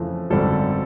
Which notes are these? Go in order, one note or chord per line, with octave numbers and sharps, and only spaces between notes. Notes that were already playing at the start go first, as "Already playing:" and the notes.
Already playing: F2 C#3 E3 A3
G#1 F#2 D3 G3 C4 A4